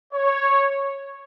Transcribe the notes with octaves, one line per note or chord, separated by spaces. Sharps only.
C#5